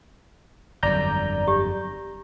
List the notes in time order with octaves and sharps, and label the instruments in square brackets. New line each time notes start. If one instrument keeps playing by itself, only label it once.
[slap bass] G1 F2 F#3 [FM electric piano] D5 A#5 G6
[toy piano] G4